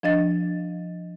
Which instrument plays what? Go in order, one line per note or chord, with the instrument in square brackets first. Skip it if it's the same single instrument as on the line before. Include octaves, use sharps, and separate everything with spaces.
[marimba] F3 D4 D#5 A6